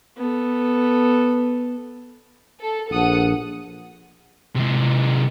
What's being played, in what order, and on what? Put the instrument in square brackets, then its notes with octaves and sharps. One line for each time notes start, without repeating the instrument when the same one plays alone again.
[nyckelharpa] B3 A4
[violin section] A4
[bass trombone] A#1 [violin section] A4 F#5 D#6
[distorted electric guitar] C3 G#3